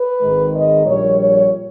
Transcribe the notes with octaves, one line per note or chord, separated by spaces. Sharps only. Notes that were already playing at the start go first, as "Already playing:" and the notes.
Already playing: B4
G#1 G#2 D#3 G#3
D#5
A#1 A#2 G3 C#5
C#5